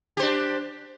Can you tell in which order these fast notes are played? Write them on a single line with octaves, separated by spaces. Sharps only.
G4 C5 D4